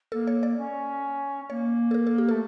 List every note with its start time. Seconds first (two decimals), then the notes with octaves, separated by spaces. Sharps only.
0.12 A#3 A4
0.27 C#5
0.43 D5
0.58 C#4
1.49 A#3 C#5
1.91 A4
1.94 A#4
2.07 A4
2.18 G4
2.29 A3 A4